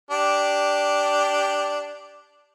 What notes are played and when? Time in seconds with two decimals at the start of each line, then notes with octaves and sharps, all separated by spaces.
0.11 D4 G4